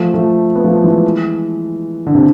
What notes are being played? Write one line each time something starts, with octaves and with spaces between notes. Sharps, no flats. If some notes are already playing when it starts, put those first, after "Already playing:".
Already playing: F3 A3
F3 A3
B3
F3 A3
E3 G#3
D3
C3